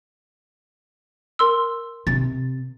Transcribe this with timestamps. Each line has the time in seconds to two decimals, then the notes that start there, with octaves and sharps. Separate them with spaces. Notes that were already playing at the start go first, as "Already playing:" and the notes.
1.39 A#4 C6 E6
2.07 C3 A6